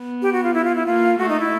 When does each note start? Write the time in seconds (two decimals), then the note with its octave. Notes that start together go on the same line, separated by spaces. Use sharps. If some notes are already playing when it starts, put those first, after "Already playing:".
Already playing: B3
0.22 G4
0.33 F#4
0.44 F4
0.54 E4
0.64 F4
0.75 E4
0.86 A#3 F4
1.18 A3 F#4
1.29 D#4
1.40 E4